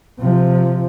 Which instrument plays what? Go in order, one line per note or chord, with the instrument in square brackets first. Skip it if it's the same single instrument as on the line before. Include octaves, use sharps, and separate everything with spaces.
[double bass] C3 F3